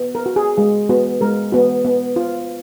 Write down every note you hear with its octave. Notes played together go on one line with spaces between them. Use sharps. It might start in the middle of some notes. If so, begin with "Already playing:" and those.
Already playing: B3
A#4
F#4
G#4
G#3 G#4
B3 F#4
G#3 A#4
B3 F#4
B3
F4